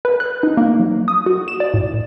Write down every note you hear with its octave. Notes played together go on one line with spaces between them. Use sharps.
B4
F#6
D#4
A#3
F#3
D#6
F#4
E7
D5
A2